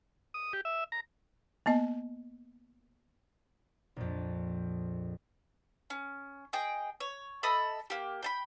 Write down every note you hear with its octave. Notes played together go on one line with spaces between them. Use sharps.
D#6
G4
E5
A#5
A#3 B3 D#5
A#1 F2
C#4
G#4 D#5 G5
C#5
A4 D#5 E5 B5
A#3 G4
G5 A5 B5